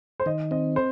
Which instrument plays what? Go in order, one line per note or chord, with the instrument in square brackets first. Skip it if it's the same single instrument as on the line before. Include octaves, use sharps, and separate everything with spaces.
[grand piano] C5
[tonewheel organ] D#3 [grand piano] D#5
[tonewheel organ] C4 [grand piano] D#5
[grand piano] C5